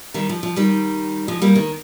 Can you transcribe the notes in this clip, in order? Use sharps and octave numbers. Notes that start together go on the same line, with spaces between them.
D#3 G3
F3
F3
D#3 G3
F3 G#3
G3 A#3
D#3